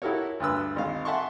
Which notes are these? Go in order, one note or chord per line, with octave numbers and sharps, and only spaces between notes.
E4 F#4 G4 A4 A#4 C#5
D2 G2 B4 E6
G#1 G#2 F5
E5 F#5 G#5 A5 C6 C#6